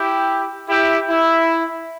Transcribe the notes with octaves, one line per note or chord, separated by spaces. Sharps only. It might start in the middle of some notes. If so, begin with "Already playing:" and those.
Already playing: E4 G4
E4 G4
E4